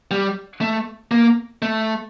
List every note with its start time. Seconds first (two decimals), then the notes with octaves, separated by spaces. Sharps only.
0.11 G3
0.61 A3
1.11 A#3
1.62 A3